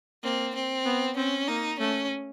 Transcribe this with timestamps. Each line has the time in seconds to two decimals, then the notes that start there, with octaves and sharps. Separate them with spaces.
0.23 A#3 C4
0.55 C4
0.86 B3
1.17 C4 C#4
1.48 A#3 D#4
1.79 A3 C#4